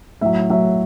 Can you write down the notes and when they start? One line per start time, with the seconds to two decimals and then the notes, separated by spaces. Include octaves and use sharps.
0.21 A2 F#3 E5
0.50 A2 F#3 E5